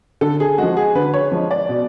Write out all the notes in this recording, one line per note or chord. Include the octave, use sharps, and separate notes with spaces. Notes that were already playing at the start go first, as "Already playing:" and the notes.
D3 A4
G#4
F3 G#3 F#4
G#4
D3 B4
C#5
F3 G#3
D5
B2